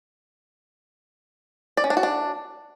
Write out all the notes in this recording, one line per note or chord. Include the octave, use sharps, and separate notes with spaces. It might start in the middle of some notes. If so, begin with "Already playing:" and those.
D5
C#4
D4
F#4
D4